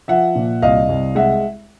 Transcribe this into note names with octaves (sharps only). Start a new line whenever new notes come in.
F3 E5 F#5
A#2
C2 D#5 F5
C2
G#3 E5 F#5